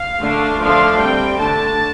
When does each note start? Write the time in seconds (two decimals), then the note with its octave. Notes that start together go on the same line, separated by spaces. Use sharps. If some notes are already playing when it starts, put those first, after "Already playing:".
Already playing: F5
0.19 D3 A3 D4
0.59 D3 F3 A3 D4 F5
0.98 G3 C4 G5
1.38 D3 A3 D4 A5